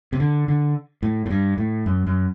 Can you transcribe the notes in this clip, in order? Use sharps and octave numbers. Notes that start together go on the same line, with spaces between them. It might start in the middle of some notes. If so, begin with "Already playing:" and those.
C3
D3
D3
A2
A2
G2
A2
F#2
F#2